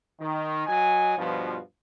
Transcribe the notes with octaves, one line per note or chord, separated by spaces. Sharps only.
D#3
F#3 D#5 G#5
G2 B2 F3